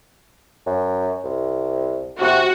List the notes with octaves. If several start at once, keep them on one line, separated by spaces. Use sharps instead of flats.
F#2
C2
C3 F#4